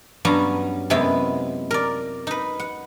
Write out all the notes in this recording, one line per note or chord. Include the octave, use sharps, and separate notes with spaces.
G2 F#3 B3 C#4 G#5 A#5
F#2 C3 G#3 B3 E4
A#4 D5
D#4 B4
F#5